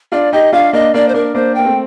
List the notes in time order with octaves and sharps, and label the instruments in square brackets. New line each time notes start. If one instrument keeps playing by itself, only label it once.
[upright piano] D4 F4 [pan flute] D5
[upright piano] D#4 G4 [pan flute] D#5
[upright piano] D4 F4 [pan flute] F5
[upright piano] A#3 D4 [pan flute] D#5
[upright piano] A#3 D4 [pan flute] D5
[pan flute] C5
[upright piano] A#3 D4 [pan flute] A#4
[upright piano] A#3 D4 [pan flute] C5
[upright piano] A#3 [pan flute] G5
[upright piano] A3 C4